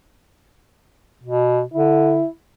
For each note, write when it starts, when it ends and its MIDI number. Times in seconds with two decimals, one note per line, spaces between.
1.24 1.62 47
1.74 2.23 50
1.74 2.27 64